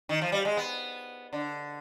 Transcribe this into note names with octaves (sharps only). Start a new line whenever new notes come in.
D#3
F3
G3
G#3
B3
D3